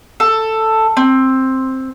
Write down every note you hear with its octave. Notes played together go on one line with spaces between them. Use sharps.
A4
C4